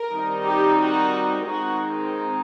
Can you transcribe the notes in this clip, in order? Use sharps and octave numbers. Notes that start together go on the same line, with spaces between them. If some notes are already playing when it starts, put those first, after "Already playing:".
Already playing: A#4
D#3 G3 C4 D#4
G4
F#4
D#3 G#3 C4 D#4 F#4